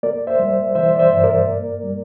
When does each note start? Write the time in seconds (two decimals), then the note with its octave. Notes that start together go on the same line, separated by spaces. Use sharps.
0.03 A#3 A#4 D5
0.27 C5 E5
0.40 G3
0.75 E3 C5 E5
0.95 D5
0.99 C5 E5
1.11 G2
1.24 A#4 D5
1.47 A#3
1.84 G3